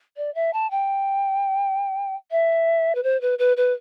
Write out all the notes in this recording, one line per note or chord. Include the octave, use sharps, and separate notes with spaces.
D5
E5
A5
G5
E5
B4
C5
B4
B4
B4